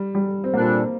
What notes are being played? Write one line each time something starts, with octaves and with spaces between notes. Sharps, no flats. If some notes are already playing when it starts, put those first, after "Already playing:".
Already playing: G3
G3
C4
A#2 G3 A#3 D4 A4